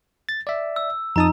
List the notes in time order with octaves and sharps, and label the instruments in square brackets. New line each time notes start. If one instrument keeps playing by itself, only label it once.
[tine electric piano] A6
D5 E5
[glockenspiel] E6
[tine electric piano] F2 A5 D#6 [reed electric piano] F3 D#4 [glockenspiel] A#5